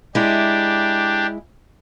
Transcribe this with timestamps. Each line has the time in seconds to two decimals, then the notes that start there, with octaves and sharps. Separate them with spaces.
0.15 G#3 D4 E4 G4